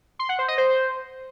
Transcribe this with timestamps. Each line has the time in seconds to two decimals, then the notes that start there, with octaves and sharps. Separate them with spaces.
0.19 C6
0.29 F#5
0.39 C5
0.48 D#5
0.58 C5